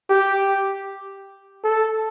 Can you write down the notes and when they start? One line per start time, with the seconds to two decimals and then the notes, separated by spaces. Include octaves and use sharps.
0.10 G4
1.64 A4